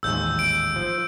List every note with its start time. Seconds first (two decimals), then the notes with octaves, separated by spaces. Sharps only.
0.03 A1 D#2 G#2 E6 G6
0.39 D7
0.76 F3